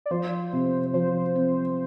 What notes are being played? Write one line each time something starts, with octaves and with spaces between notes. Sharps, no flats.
D5
F3 C5
C3
F3 C5
C4